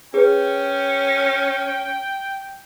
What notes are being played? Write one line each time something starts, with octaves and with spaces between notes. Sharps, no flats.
C#4 G#4 B4 G5